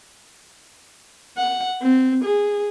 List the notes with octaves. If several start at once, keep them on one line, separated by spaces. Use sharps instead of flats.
F#5
C4
G#4